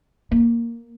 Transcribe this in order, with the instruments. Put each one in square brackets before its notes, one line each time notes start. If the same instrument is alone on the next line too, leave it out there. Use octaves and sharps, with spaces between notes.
[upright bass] A#3